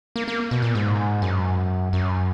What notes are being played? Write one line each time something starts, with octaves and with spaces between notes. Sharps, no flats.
A#3
A#3
B2
A#2
G#2
F#2
F#2